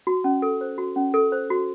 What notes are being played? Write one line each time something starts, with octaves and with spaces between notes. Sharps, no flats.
F#4
C#4
A4
C5
F#4
C#4
A4
C5
F#4